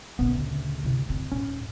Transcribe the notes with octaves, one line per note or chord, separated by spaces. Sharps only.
A#1 A#2 C#3 B3
D2
C3 E4
F#2 C4
D#1 G#2 C#4